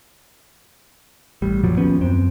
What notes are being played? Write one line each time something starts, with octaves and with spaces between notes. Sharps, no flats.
A1 G3
F#1 A#2 F3 F#3
D#2 F3 B3 C#4
F#2 C4